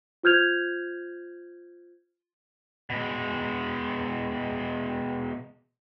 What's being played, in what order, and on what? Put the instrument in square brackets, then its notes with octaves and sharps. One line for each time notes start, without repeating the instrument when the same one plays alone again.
[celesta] F4 C5 F6 G6 G#6 F7
[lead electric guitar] B2 G#3